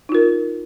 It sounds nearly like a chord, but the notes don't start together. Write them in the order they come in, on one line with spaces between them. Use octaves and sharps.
D#4 F4 A#4